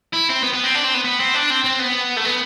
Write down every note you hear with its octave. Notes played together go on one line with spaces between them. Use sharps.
E4
C4
B3
B3
C4
D4
C4
B3
B3
C4
D4
C4
C4
B3
A3
B3